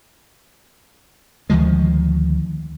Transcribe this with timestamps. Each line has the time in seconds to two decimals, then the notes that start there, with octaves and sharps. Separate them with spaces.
1.50 D2 D#3 F3 G#3